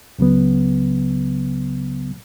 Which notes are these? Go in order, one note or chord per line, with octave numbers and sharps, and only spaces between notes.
C#2 C#3 F#3 B3